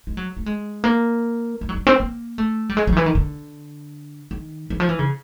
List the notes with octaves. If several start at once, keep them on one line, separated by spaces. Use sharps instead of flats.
G#3
F#3
A3
G#3
A#3
A3
F#3
G3
C4
A#3
A3
G3
G#3
F#3
D#3
E3
D#3
D3
D#3
E3
F3
E3
C#3